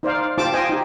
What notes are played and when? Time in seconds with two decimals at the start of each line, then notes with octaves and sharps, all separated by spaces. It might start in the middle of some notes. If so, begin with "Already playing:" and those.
0.03 D#4 C5 D5 F5
0.38 F4 G4 C5 A5 D6
0.53 F4 C5 D#5 G5 G#5 D6
0.69 D#4 G4